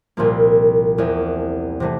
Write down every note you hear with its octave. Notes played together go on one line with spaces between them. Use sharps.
C2 A#2 F3 A#3
E2 C3 E3
C3 E3 A3